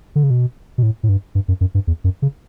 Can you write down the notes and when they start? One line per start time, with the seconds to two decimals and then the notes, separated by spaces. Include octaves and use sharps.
0.16 D3
0.23 C#3
0.30 B2
0.78 B2
0.83 A2
1.03 A2
1.09 G2
1.35 G2
1.48 F#2
1.61 F#2
1.75 G2
1.87 E2
2.04 F#2
2.22 C#3